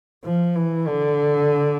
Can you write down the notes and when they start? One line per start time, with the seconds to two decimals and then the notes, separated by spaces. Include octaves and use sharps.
0.24 F3
0.56 E3
0.88 D3